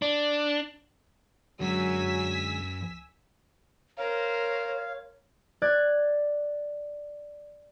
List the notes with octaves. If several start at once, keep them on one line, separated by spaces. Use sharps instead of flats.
D4
F#2 D3 F#3 G#3 G#5 E6 B6
A#4 C5 C#5 F5
D5 F#6 G#6